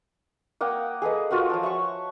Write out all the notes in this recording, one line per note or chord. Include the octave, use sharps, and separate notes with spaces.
A#3 F#5 G5 D#6
G#4 A4 B4 D#5
F4 F#4 A#4 F#5
F3 C#5 A5
E5 F#5 C#6